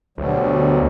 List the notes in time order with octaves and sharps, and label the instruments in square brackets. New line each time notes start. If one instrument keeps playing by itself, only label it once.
[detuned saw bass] D2 [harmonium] B2 F#3 G3